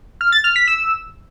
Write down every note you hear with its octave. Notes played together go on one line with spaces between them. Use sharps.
F6
A6
F6
B6
E6